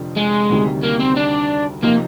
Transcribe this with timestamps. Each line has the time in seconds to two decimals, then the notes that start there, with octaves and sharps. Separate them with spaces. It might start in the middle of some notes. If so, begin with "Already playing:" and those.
Already playing: F1 F2 D3 F3
0.16 G#3
0.50 D2 C3 D#3 G3
0.83 A#3
0.99 C4
1.16 D4
1.83 C3 F3 A#3 C4 D#4